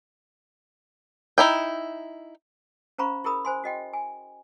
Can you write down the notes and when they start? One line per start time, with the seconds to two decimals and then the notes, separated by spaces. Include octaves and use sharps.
1.38 D#4 E4 G5
2.98 C#4 C5 F5 A#5 B5 C#6
3.24 E4 G#4 A#4 B5 D#6
3.45 C5 G#5 C6
3.64 F#4 D#5 G5
3.93 G#5